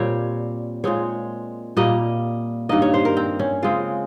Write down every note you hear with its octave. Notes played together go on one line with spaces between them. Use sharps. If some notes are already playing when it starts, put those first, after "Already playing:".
Already playing: A#2 G3 C4 C#5
A#2 G#3 C4 C#5
A#2 G3 A#3 D#5
G2 D#3 A#3 D#5
C#5
C5
A#4
C4
C#4
C#3 G#3 C4 F4